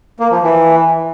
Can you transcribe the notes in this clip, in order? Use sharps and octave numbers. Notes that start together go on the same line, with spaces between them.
A#3
F3
E3